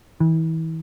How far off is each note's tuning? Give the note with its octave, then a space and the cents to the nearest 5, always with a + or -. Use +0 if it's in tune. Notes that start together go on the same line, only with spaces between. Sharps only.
E3 -35